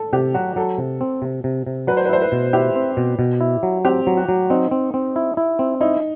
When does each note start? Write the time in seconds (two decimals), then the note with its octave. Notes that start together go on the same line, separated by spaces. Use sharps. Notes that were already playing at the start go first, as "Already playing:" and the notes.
Already playing: A4
0.13 C3 G4
0.34 F#3 F#4
0.56 F#3 A4
0.78 C3
1.01 C4
1.22 C3
1.44 C3
1.66 C3
1.87 F#3 B4
1.97 C5
2.05 B4
2.09 E4 C5
2.21 B4
2.32 B2
2.53 E4 G4
2.76 C4
2.97 B2
3.19 B2
3.41 E4
3.63 F#3
3.85 C4 G4
4.07 F#3
4.17 F#4
4.29 F#3
4.50 C4 D#4
4.71 C4
4.94 C4
5.16 E4
5.37 E4
5.59 C4
5.81 D#4 E4